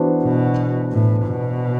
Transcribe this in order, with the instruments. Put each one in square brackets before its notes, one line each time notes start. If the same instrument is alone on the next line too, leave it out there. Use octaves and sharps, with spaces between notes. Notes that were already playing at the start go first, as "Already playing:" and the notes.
Already playing: [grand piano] E3 B3 D4 F#4 C5
[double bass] B2
A2
B2